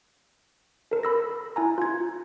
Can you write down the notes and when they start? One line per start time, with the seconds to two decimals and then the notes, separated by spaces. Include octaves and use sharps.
0.91 A4 A#4
1.03 B5 E6 A#6
1.56 E4 G#5 A#5
1.78 F4 G#6